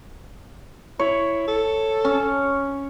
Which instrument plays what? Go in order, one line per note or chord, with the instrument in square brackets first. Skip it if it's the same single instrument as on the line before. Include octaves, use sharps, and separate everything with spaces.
[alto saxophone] E4 [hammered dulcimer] C#5
[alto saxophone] A4
[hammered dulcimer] C#4